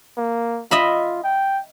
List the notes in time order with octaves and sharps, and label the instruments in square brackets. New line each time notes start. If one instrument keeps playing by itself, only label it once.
[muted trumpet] A#3
[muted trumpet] F4 [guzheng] D#5 E5 B5
[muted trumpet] G5